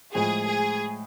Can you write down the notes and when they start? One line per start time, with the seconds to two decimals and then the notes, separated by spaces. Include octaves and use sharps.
0.15 A2 F3 G#3 G#4
0.48 G#4